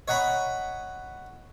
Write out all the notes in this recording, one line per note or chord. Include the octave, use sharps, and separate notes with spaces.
C#5 D#5 F#5 A#5 B5